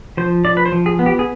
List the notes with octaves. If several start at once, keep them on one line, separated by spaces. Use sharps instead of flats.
F3 C5
F3 D5
B4
C5
F3
G#4
B3
G4
G#4